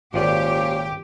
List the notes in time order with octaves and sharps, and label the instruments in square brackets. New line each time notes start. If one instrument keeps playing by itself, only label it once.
[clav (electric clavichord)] G#1 F4 D5 [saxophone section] A#2 F3 C#4 [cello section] G4